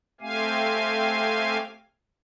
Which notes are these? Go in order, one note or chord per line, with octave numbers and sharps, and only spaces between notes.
A3 C4 G4 F5 G#5